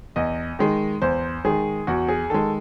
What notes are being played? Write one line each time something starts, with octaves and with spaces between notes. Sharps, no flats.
E2 D#5
D#3 G#3
E2 C5
D#3 G#3 G#4
E2 F#4
G#4
D#3 G#3 A4